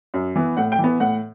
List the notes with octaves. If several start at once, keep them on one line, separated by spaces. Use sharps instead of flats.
F#2
E3 B3
A2 F#5
G5
E3 B3
A2 F#5